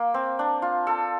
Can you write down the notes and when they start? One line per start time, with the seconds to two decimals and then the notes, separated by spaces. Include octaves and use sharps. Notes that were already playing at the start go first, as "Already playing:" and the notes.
Already playing: A#3
0.14 C4
0.39 D4
0.62 F4
0.87 A4